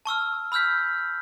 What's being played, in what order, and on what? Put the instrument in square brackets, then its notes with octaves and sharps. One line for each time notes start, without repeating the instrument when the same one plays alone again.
[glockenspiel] A5 C#6 E6 F6
B5 E6 F6 G6 B6